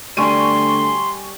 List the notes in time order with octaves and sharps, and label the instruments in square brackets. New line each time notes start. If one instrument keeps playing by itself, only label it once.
[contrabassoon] D2 [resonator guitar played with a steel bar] G3 [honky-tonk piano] G#5 C#6 D#7 [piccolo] C6